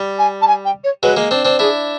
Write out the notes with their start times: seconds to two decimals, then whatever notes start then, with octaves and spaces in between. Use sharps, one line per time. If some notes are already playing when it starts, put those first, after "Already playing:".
Already playing: G3
0.18 G#5
0.41 A5
0.47 G#5
0.65 G5
0.84 C#5
1.03 F#3 G#3 B4
1.17 G#3 A#3
1.31 C4 D4
1.45 C4 D4
1.59 D4 E4 G#4